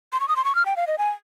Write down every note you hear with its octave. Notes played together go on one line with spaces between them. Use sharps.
C6
C#6
D#6
C6
C#6
F6
G5
F5
D#5
G#5